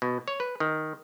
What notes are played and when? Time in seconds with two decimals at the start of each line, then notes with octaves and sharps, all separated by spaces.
0.02 B2
0.28 C#5
0.40 B4
0.60 D#3